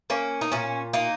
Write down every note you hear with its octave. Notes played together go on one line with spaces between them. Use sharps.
A#3 C#4
D#4
A#2 C#4
A#3 D#4